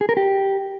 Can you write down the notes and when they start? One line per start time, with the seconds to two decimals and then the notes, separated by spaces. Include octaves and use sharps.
0.01 G#4
0.09 A#4
0.17 G4